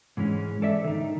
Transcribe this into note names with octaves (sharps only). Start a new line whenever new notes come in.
G#2 E3 G#3 C#4
A4 D5 E5
D#3 D#4